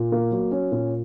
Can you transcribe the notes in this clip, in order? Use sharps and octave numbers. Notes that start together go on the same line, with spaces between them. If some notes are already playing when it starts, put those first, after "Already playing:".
Already playing: A#2
A#3
F#3
C#4
A#2